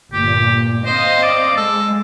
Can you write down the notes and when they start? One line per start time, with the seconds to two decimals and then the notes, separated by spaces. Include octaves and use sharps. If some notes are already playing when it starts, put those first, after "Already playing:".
0.13 G1 A#2 G4
0.85 C4 C5 D#5 F5
1.23 D5
1.57 G#3 A4